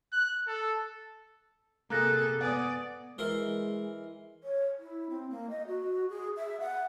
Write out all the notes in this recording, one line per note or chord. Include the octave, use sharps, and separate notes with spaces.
F#6
A4
C3 A#3 G#4 A4 A#5 F#6 A#6
B3 D5 F#5 G#5 D#6
E3 G#3 A#4 C6
C#5
E4
C4
A#3
D#5
F#4
G#4
E5
F#5